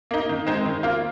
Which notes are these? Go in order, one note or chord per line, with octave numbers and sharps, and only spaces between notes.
A#3 D#4
D#3
G#3 C4 D#4
D#3
A#3 F4